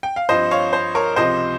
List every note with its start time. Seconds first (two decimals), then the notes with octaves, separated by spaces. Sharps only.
0.03 G5
0.16 F5
0.29 G2 F3 C4 C5 D#5
0.51 C#5 F5
0.73 C5
0.95 A#4 C#5
1.16 C#2 C3 F3 C4 C5 D#5